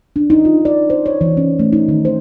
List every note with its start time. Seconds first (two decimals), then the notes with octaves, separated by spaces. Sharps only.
0.16 D4
0.30 D#4
0.45 F4
0.65 D5
0.90 C5
1.06 C#5
1.21 E3
1.37 C#4
1.59 A3
1.73 D#4
1.88 D#3
2.05 C5